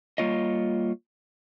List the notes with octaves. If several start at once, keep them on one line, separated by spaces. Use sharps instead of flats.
G3 A#3 F4 C#5 D#5